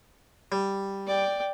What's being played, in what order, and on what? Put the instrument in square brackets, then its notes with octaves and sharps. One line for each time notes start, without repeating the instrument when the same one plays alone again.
[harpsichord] G3
[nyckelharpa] D5 G5